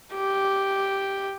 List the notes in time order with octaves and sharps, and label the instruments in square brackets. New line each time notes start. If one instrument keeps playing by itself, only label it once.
[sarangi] G4